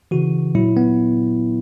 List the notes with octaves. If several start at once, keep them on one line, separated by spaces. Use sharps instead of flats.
C#3 E3 F#4
A#2 F#3 E4
B3